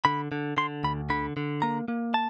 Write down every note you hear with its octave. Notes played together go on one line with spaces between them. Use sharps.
D3 B5
D3
D3 C6
D2 B5
D3 B5
D3
A#3 A#5
A#3
A5